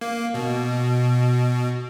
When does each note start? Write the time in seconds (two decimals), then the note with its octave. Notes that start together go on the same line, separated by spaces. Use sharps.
0.01 A#3
0.34 B2